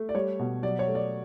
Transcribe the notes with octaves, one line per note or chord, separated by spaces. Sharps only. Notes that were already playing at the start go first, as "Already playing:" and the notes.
Already playing: A3
D5
G3 C#5
B2
F#3 D5
C#5
A3
D5